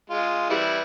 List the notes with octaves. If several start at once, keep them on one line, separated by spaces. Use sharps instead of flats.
G#3 F4
E3 G3 E4